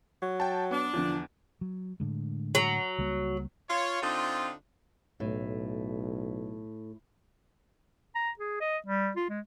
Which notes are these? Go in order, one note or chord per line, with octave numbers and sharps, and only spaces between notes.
F#3
G5 A5
B3 D4
E2 D3 F3
F#3
A2 D3 G#3
F#3
C#2 G3 A#3
F4 C#5
D3 C4 D#4 F4
B1 A2
A#5
G#4
D#5
G3
F4
G#3